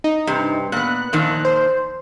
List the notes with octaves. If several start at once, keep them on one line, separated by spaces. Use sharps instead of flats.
D#4
G2 C3
A#2 B3 F#6
A#2 D#3 F3
C5